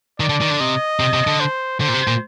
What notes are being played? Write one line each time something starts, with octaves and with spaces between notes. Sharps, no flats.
D#3 D5
D3
D#3
D3
C3 D#5
C3
C3
D3
C5
D3 C5
A#2
C3
A#2